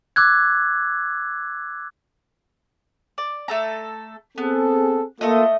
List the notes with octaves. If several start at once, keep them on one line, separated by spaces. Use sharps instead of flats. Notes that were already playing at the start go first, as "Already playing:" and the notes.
D6 E6 F#6 G#6
D5
A3 A4 A#5
B3 C4 G#4 A4
A3 A#3 F4 A4 D#5